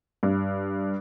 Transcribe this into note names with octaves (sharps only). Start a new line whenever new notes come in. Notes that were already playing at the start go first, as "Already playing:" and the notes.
G2